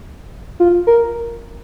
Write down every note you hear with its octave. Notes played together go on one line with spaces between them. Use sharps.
F4
A#4